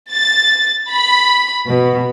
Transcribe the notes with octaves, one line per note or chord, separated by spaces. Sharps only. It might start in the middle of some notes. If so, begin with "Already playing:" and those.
A6
B5
B2